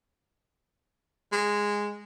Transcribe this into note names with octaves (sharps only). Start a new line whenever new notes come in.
G#3